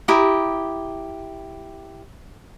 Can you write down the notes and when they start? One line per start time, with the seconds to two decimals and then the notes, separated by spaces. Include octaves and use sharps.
0.08 E4 G4 A#5 D#6